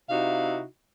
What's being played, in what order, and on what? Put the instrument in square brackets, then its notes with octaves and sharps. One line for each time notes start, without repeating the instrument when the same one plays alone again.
[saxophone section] C3 D#4 E4 F#4 F5